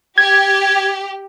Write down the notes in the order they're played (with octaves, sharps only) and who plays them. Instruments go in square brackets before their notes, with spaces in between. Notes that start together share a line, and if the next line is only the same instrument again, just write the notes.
[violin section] G4 [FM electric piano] G#6